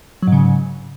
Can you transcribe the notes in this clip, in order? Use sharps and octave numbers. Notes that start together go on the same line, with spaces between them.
G#2 C#3 F#3